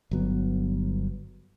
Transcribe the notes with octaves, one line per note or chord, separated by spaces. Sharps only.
G1 F#3 B3